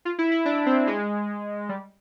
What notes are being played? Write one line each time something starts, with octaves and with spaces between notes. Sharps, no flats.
F4
E4
E4
D4
C4
G#3
G3